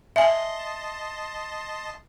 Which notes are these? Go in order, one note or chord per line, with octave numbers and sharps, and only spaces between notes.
D#5 E5 G#5 A5 C6